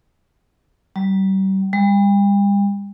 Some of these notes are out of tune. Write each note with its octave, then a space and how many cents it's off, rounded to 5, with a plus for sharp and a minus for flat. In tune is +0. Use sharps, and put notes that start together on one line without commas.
G3 -35
G3 +40